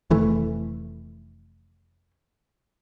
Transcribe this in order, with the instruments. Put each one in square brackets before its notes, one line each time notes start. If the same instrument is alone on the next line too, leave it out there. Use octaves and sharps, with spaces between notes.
[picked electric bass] F1 E3 A3